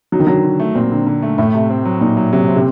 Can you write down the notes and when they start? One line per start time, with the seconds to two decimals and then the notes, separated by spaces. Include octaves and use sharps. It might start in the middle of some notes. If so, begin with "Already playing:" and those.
0.12 F#3 D#4
0.19 D#3
0.27 D3 F#3
0.44 D3
0.60 A3
0.75 A#2 C4
0.91 D3
1.07 D3
1.22 A3
1.38 A2 A3
1.54 C3
1.70 C4
1.85 F#3
2.01 A#2 D#4
2.17 F#3
2.33 C3 F#3
2.48 C4
2.56 C3